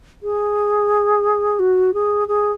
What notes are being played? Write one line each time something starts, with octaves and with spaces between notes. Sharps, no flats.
G#4
F#4
G#4
G#4